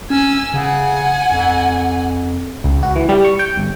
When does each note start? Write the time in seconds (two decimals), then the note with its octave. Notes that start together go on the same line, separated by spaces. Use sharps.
0.10 C#4 G#5 E6
0.54 C#3 F#5 G#5
1.32 F2
2.64 C#2
2.83 F#4
2.96 E3
3.09 G3
3.24 C#6
3.39 G5
3.57 G1